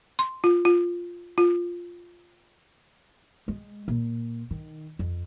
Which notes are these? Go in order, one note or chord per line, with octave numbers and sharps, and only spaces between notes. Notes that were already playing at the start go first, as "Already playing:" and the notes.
C6
F4
F4
F4
G#3
A#2
D#3
F2